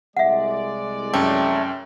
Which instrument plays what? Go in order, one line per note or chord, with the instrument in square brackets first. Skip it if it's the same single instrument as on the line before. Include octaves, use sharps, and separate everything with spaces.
[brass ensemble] C2 G#3 D5 [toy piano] E5 F#5
[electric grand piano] F#2 C#4 G5 [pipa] A3